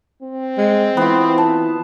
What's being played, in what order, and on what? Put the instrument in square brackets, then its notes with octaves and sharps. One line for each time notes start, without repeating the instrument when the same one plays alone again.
[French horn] C4
[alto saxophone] G#3
[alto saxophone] E3 [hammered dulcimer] B3 F4
[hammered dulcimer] A5